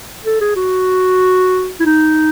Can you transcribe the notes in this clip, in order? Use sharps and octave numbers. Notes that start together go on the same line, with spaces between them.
A4
G#4
F#4
E4
D#4